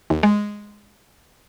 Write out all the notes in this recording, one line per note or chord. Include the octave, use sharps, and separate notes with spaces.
D#2
G#3